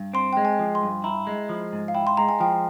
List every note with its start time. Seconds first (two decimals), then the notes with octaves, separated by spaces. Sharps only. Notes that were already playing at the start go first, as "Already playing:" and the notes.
Already playing: G2
0.14 C4 C6
0.33 G#3 G5
0.45 G#5
0.59 F3
0.75 C6
0.83 G2
1.04 E4 A#5
1.27 G#3
1.49 F3
1.73 G#2
1.88 F5
1.95 E4 G5
2.07 C6
2.17 G#3 A#5
2.29 G#5
2.40 F3 G5